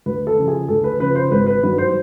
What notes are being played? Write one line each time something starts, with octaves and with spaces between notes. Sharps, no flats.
D2 B4
A4
C#3 F3
G#4
D2 A4
B4
C#3 F3 B4
C5
G#1 B4
B4
G2 D#3 F#3 B4
C5